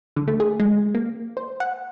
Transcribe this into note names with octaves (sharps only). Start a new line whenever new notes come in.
D3
A3
G#4
G#3
A#3
C5
F#5